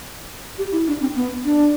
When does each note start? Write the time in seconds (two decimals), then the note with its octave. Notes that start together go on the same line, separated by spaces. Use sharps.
0.58 G4
0.72 E4
0.87 D4
1.01 C4
1.15 B3
1.45 D4